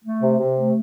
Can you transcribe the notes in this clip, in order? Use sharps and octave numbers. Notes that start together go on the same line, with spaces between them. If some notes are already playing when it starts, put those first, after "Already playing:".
A3
C3
C3
A3